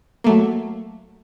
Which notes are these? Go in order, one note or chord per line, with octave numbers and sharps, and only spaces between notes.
F#3 A3 A#3